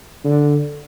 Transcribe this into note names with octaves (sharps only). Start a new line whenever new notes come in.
D3